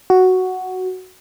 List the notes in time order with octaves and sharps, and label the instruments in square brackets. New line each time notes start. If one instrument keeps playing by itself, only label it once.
[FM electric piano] F#4